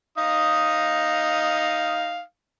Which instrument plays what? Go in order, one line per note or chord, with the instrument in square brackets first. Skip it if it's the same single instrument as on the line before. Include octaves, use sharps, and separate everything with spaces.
[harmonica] D#4 F5 D#6